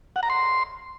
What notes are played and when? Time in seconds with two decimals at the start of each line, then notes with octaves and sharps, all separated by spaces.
0.16 F#5
0.23 A#5
0.30 C6